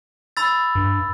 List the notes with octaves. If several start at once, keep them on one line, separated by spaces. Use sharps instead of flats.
B5 E6 A6
G2